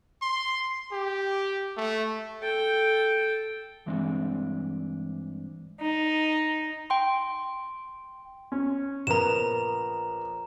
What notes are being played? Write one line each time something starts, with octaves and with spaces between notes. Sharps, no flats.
C6
G4
A3
A4 G5
G2 E3 G#3 C4 D4
D#4
G5 C6
C#4
A#1 B3 A#4 A#5 E7